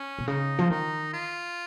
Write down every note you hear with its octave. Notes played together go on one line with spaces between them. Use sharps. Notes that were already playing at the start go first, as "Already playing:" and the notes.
Already playing: C#4
B2
C#3 D#4
F3
D#3 D#4
F4